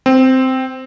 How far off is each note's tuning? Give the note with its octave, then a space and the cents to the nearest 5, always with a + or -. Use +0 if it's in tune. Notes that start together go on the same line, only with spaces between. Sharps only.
C4 -5